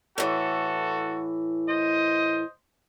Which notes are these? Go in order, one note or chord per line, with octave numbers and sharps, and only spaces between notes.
A2 E3 F#4 A4
C5 D#5